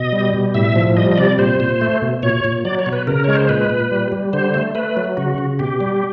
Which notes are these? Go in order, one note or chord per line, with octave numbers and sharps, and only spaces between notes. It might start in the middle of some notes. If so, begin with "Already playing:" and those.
Already playing: B2 D#5
G3
B2
A2 E5
F3
G3 D#5
D#5
C3 D5
A#2 C5
A#2
A3
B2
A#2 C#5
A#2
F#3 D5
C#5
B2
B4
C#3 A#4
G#3 C#5
C5
A#2 B4
A#2
G3
G3
D3 C5
A3
A3 B4
F#3
C#3 F#4
C#3
B2 G4
G3